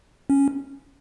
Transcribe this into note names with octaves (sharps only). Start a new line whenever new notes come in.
C#4